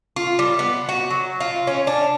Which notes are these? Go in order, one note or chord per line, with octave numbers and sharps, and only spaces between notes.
F4
G3
B3
F#4
F#3
F4
C#4
D4